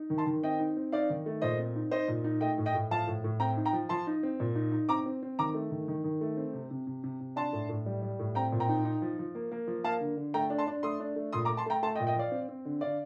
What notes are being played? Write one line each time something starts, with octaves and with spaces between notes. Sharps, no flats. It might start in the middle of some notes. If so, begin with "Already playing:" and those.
Already playing: D#4
D#3
A5 C6
D#3
C4 D#5 G5
D#4
C4
D#4 D5 F5
D#3
A3
A#2 C5 D#5
C4
D#4
D#4 C5 D#5
A#2
D#4
A3 D#5 G5
A2
D#5 G5
A2
F3 F5 A5
A2
A2
C4 G5 A#5
D#4
G5 A#5
F3
F3 A5 C6
D#4
C4
A#2
D#4
D#4
C4 A#5 D6
C4
C4
D#3 A#5 D6
A3
D#3
D#3
D#3
A3
C4
C3
C3
C3
C3
C3
D4 A5 C6
A2
A2
G3
G3
A2
C4 G5 A#5
A#2
G5 A#5
D#4
D#4
F3
F3
A#3
A#3
F3
A#3 F5 A5
D3
D3
A3 G5 A#5
D4
A5 C6
D4
A3 C6 D#6
D4
A3
A#2 C6 D#6
A#5 D6
A3
A5 C6
A3 G5 A#5
A3 A5 C6
D#5 G5
A#2
D#5 G5
F3 D5 F5
C4
C4
D3
D3 D5 F5